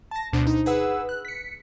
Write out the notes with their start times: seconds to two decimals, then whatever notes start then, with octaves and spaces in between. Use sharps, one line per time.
0.11 A5 A#6
0.33 D2 B2 D4 C5
0.47 D#4
0.66 G#4 B4 F#5 E6
1.09 F#6
1.25 B6 C#7